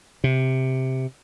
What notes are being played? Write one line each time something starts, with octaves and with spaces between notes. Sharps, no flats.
C3